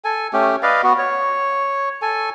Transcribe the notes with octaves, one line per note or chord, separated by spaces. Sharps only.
A4 G#5
A3 C#4 G4
B4 D5 D#5 F5
B3 F#4
C#5
A4 G#5